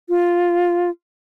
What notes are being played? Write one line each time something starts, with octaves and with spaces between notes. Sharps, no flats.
F4